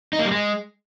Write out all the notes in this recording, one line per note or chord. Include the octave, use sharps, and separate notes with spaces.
D#4
A#3
G3
G#3